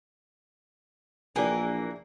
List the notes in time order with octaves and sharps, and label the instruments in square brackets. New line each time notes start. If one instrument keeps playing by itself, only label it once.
[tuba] A#1 [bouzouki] E3 A#3 [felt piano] D4 G4 G#4 [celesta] G#5